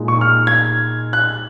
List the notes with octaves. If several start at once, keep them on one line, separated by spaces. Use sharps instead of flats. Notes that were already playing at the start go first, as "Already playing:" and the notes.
Already playing: A#2 G#3 D#4
C#6
F6
G#6
F#6